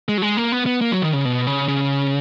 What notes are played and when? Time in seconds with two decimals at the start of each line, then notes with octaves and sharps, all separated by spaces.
0.08 G#3
0.18 F#3
0.22 G#3
0.37 A#3
0.52 B3
0.66 B3
0.81 A#3
0.92 F#3
1.02 D#3
1.13 C#3
1.25 B2
1.47 C#3
1.68 C#3